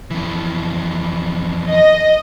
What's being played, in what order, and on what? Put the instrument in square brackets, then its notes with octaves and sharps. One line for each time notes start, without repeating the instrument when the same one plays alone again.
[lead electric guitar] F2 E3
[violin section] D#5